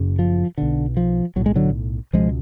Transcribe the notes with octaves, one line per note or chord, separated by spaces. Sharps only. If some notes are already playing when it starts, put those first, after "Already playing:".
Already playing: F#1 F#2 C#3
F3
B1 B2 D3
F3
B1 A2 F#3
G#3
D3 F#3
C#2 B2 F3 G#3